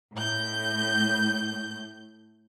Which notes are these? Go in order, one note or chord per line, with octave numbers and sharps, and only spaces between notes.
A2 G6